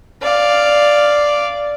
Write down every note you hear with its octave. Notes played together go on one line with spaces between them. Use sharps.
D5 F5